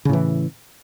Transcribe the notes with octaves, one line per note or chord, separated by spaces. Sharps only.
A2 C#3 E3